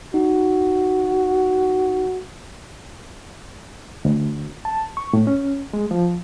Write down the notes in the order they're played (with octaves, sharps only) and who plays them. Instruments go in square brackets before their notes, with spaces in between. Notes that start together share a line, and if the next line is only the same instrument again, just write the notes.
[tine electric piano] D#4 [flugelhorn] F#4
[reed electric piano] D2
A5
C#6
A2
C#4
G#3
F3